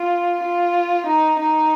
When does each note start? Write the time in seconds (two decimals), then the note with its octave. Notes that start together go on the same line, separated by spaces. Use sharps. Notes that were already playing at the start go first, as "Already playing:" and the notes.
Already playing: F4
0.42 F4
1.07 D#4
1.39 D#4